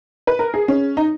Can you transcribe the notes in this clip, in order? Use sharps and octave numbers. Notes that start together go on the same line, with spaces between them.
B4
A#4
G#4
C#4
D#4